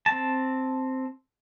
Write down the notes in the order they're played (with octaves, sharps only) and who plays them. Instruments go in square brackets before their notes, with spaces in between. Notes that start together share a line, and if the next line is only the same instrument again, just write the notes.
[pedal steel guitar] C4 A5